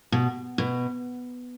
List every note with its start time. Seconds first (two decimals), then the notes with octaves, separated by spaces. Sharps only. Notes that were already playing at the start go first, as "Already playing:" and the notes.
0.12 B2
0.58 B2